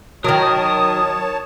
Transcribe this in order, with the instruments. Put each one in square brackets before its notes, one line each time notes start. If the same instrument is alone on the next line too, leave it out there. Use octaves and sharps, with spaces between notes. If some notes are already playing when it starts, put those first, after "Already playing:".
[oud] D#3 F#3 [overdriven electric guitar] A#4 [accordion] C#5 A5 [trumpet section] D#6